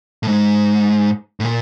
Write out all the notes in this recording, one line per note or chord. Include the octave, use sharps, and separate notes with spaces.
A2
G#2
A2
A#2